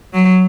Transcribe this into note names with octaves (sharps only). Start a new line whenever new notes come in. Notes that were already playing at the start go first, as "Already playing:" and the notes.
F#3